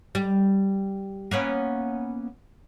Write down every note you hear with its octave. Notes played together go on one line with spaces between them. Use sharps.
G3
A#3 B3 C#4